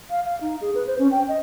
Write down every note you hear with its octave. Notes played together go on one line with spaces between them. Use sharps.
F5
F5
D#4
G#4
B4
C5
C#4
G5
D#5